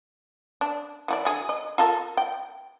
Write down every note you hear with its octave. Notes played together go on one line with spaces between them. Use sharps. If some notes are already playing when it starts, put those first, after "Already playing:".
D4
E3 F#4 D5
D3 F#4 G#4
D#5
F4 A4 A#4
G5